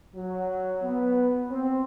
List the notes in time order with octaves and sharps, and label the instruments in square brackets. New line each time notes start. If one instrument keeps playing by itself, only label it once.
[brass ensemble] F#3
B3
C4